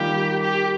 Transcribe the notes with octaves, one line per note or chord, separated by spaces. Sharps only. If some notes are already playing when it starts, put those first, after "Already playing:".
Already playing: D#3 G3 A#3 F4 G4
G4